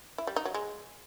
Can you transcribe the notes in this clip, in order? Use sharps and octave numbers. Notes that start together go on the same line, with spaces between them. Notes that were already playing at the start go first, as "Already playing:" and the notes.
E4
G3
D#4
F#3
G#3